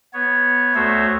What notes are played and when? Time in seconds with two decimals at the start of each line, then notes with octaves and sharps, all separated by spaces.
0.14 B3 C#5
0.75 D2 A3 F#4 C5 C#5 E5